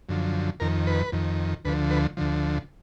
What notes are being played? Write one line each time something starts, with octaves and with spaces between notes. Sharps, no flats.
F#2 D3 F3
F2 D#3 A#4
B4
F2 D#3
D2 D3 F3 B4
B4
D2 D3 F3